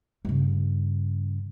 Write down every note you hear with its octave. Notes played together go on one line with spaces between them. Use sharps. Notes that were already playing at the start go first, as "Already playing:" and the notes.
G2 C#3